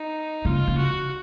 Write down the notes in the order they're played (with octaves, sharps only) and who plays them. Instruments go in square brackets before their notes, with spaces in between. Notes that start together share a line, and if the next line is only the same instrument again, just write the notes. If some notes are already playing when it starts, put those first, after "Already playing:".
Already playing: [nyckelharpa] D#4
[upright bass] C#3 [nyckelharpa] F4
[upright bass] C#3
[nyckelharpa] F#4